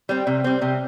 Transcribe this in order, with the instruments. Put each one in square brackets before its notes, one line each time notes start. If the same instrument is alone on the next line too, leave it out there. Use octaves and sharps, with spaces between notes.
[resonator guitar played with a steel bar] G3 C4
C3
G3 C4
C3